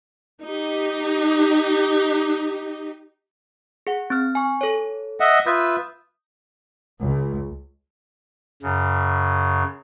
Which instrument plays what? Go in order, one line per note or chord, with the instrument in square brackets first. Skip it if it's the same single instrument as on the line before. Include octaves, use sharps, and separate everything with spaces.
[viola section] D#4 G4
[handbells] G#4 F#5
C4 F6
G#5 C#6
A4 C#5
[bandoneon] D#5 E5 F#5
[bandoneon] F4 B4 E5 [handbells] D#6 G6
[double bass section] C#2
[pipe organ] F#2 C#3